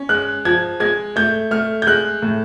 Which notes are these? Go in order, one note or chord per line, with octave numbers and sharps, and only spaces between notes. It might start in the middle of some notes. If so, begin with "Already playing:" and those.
Already playing: C#4
G#3 F#6
F3 G#6
G#3 G#6
A3 G6
A3 F6
G6
G#3 F#6
A2